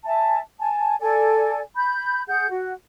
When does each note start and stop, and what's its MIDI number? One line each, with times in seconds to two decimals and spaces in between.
0.06 0.39 76
0.06 0.39 80
0.06 0.39 81
0.59 0.95 80
0.59 0.95 81
1.00 1.61 69
1.00 1.61 74
1.00 1.61 80
1.76 2.22 83
1.76 2.22 91
2.28 2.47 68
2.28 2.47 78
2.28 2.47 91
2.50 2.73 66